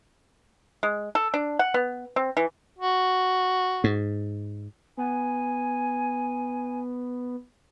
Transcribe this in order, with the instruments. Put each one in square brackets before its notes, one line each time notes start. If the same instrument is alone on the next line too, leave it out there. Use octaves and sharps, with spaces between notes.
[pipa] G#3
A4
D4
F#5
B3
C4
E3
[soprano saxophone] F#4
[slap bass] G#2
[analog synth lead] B3 [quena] G#5